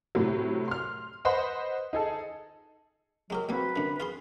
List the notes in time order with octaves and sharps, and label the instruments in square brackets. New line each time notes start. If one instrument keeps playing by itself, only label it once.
[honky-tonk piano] A2 C3 F#3
C6 F6
B4 C5 D#5 F#5 B5
D#4 G#4 A4
[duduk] F#3 [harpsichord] G#3 G4 A#4
[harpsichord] F#3 G3 [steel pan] A#3 C4 F#4 [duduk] B4
[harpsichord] F#2 D3
F4 G#4 C6